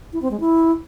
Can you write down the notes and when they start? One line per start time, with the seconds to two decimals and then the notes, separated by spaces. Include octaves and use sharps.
0.13 E4
0.22 C4
0.31 G#3
0.40 E4